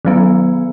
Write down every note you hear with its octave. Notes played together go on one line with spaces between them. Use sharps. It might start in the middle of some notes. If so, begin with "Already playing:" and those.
D#3 F#3 B3